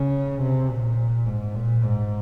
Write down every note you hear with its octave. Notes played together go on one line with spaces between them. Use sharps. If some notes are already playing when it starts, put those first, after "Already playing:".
Already playing: C#3
C3
A#2
G#2
A#2
G#2